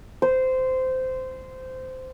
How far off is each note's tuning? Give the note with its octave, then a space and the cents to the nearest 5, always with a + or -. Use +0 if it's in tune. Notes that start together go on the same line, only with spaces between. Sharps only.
C5 -15